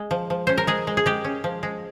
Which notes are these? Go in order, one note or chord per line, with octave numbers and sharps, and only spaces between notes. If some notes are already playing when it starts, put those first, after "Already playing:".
Already playing: G#3
F3
F3
C#4 C5
A#4
G#3 G#4
G#3
G#4
G#3 G4
C#4
F3
G#3